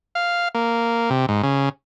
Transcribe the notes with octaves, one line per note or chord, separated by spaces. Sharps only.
F5
A#3
C3
G#2
C#3